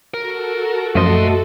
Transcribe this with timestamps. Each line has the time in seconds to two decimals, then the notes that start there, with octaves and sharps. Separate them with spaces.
0.14 F#4 A4 A#4
0.95 F#2 A#2 F3 A3 D#5 C6 D#6